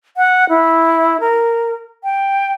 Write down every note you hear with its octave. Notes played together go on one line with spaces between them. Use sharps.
F#5
E4
A#4
G5